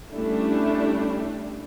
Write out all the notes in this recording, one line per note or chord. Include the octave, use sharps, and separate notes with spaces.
G3 A3 C#4 D4 E4